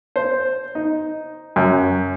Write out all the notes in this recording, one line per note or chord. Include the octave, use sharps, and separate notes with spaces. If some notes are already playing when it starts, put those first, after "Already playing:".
C5
D#4
F#2